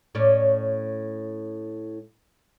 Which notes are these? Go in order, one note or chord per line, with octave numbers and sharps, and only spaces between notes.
A2 C#4 D5